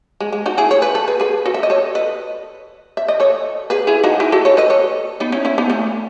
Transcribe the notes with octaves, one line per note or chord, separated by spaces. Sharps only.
G#3
G#3
D#4 F#4
E4 G#4
C#5
B4
A4
G#4 B4
G#4 B4
F#4 A4
E5
D#5
A4 C#5
B4 D#5
E5
D#5
A4 C#5
G#4 B4
E4 G#4
D#4 F#4
E4 G#4
F#4 A4
A4 C#5
B4 D#5
A4 C#5
B3 D#4
C#4 E4
C#4 E4
B3 D#4
A3 C#4